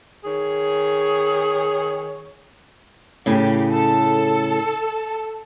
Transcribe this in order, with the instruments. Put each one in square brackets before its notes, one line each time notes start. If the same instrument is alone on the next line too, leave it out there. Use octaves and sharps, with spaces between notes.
[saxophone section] D#3 G#4 C#5
[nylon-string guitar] A2 C#3 [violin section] G4
[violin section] A4